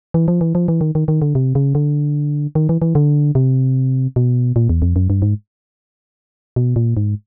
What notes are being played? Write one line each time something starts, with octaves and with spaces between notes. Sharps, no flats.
E3
F3
E3
F3
E3
D#3
D#3
D#3
D3
C3
C#3
D3
D#3
E3
E3
D3
C3
B2
A#2
E2
F2
F#2
G2
G#2
B2
A#2
G#2